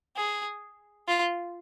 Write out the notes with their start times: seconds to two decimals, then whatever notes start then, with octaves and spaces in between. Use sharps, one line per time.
0.17 G#4
1.08 F4